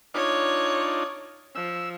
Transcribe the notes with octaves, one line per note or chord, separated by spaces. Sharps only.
D4 D#4 F4 C#5
F3 E6